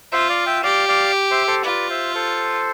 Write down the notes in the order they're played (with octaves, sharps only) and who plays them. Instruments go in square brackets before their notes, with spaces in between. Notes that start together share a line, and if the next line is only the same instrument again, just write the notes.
[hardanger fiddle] F4 [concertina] C5 E5
[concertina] D5 F5
E5 G5
[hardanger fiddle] G4 [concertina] D5 F5
[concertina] D5 F5
C5 E5
A4 C5
[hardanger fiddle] F4 [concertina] B4 D5
[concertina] C5 E5
A4 C5